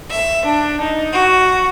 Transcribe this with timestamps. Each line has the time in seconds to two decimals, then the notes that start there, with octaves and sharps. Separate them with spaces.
0.10 E5
0.45 D4
0.81 D#4
1.12 F#4